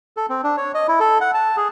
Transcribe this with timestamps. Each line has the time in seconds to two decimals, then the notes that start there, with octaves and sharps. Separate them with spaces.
0.17 A4
0.30 C4
0.44 D4
0.57 C#5
0.74 D#5
0.88 E4
1.00 A4
1.21 F#5
1.34 A5
1.57 G#4